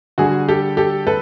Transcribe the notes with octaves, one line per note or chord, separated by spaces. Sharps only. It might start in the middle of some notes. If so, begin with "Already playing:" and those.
D3 G3 F#4 G#4
G4 A4
G4 A4
A4 B4